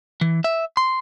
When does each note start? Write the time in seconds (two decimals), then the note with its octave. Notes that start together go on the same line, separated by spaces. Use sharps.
0.21 E3
0.44 E5
0.77 C6